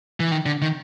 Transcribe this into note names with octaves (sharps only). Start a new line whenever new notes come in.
E3
D#3
D3
D#3